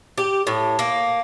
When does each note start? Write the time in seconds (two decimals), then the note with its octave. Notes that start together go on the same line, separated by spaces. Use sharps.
0.18 G4
0.47 A2
0.79 A#3